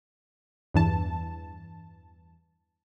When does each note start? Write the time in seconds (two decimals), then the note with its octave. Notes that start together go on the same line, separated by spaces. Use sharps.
0.74 E2 G2 E3 A5